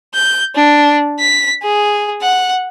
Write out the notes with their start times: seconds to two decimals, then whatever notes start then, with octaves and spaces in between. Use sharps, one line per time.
0.14 G6
0.55 D4
1.19 B6
1.63 G#4
2.22 F#5